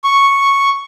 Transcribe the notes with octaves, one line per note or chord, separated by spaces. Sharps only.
C#6